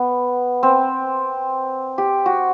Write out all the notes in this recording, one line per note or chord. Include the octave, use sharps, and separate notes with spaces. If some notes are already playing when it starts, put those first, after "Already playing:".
Already playing: B3
C4
G4
F#4